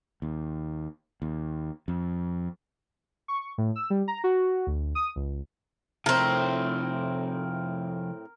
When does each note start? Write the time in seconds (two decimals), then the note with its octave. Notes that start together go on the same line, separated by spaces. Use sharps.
0.22 D#2
1.22 D#2
1.88 F2
3.28 C#6
3.58 A2
3.76 E6
3.90 G3
4.08 A#5
4.24 F#4
4.67 D2
4.95 D#6
5.16 C#2
6.06 A2 C3 F3 C4 A#4